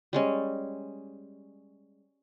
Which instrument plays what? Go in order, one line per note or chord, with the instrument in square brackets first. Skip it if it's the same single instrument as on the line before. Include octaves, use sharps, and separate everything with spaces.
[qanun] G3 G#3 C#4